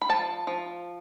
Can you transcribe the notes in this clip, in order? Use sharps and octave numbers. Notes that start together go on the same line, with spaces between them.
B5
F3 A5
F3